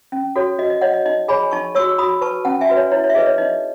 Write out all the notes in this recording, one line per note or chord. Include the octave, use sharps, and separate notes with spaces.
C#4
F#4 A4 C#5
F#4 D#5
D#5
C#5 D#5 F#5
D#5
D#4 D#5
G#4 C#5 G#5 B5
D#4 A5 C#6
F#4 C#5 C#6 E6
F#4 B5 D#6
B4 A5 C#6
C#4 F#5 A5
E5 G#5
F#4 B4
C#5
E4 C#5
C#5
E5
G#4 B4 D#5
C#5
D#4 D#5